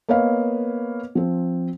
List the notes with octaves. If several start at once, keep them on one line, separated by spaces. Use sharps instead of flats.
A#3 B3 B4 C#5 D#5 F5
F3 C4